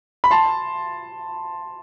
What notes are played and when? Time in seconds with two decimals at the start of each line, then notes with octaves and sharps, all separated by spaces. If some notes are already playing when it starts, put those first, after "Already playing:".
0.24 B5
0.31 A5 C6